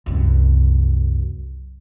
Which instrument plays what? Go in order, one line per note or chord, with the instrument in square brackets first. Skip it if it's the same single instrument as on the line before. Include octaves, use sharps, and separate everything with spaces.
[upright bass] C2 F#2